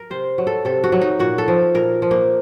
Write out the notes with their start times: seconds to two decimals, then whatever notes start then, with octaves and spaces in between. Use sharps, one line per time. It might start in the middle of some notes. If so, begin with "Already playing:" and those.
Already playing: A#4
0.10 C3 C5
0.38 F#3
0.47 A4
0.65 C3 A4
0.84 F#4
0.92 F#3
1.01 D#4
1.19 A#2 F#4
1.38 A4
1.48 F3
1.74 A#2 A#4
2.02 F3
2.11 A#3